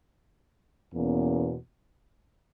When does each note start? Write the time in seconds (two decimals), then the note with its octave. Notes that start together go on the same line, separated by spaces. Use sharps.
0.93 E2 B2 A#3 C#4